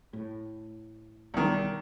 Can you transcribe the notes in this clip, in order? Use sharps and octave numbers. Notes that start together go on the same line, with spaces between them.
A2
B1 E2 D#3 G3